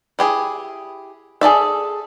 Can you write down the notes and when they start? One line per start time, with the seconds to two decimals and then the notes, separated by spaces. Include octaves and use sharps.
0.19 E4 G4 G#4
1.41 G#4 A4 D5 E5